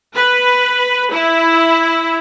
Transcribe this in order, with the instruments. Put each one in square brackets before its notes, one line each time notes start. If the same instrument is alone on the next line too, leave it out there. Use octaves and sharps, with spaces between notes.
[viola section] B4
E4